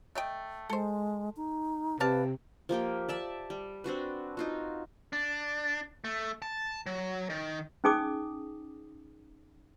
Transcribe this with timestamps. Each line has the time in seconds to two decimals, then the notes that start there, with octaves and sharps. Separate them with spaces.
0.15 A3 D#5 G5
0.70 G#3 A4 C5
1.36 D#4
2.00 C3 B4 D5 F5 A5
2.69 F3 A#3 G4 G5
3.08 D5 E5 A5
3.50 G3
3.84 C4 D4 F#4 B4
4.37 D#4 F4 F#4
5.13 D4
6.04 A3
6.42 A5
6.86 F#3
7.30 D#3
7.84 C#4 D#4 G#4 G#5 D6 D#6